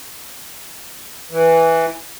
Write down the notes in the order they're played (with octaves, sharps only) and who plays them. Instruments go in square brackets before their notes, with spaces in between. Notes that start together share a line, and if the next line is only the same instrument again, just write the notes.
[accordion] E3